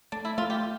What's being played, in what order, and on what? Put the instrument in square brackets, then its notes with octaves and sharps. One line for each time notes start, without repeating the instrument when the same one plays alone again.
[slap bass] A3 [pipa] D4
[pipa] E4
[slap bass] A3 [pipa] F4
[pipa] G4